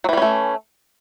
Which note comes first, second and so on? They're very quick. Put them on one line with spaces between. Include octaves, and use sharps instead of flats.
F#3 E3 G3 C#4 A3